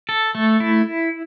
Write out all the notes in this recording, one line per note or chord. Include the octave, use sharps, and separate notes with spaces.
A4
A3
E4